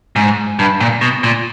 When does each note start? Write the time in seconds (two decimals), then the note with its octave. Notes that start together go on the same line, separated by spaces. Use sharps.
0.16 G#2
0.59 G2
0.80 A#2
1.01 B2
1.23 A#2